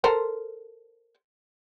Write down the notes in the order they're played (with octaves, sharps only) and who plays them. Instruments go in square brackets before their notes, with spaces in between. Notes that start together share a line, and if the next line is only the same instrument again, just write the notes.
[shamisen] A4 A#4 C5